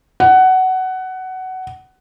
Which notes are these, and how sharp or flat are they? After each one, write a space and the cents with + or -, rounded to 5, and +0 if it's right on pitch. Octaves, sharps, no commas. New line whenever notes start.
F#5 +15